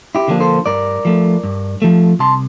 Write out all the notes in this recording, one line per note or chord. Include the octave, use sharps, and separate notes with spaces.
E4 G4
D3 F3 A#3 D4
A4 C5
G2 A#4 D5
F3 A3
G2
F3 A3
C2 A5 C6